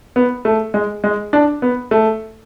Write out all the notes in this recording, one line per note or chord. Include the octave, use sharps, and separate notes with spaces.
B3
A3
G#3
G#3
D4
B3
A3